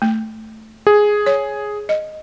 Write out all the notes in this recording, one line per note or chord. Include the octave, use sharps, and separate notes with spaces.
A3
G#4
C#5
D#5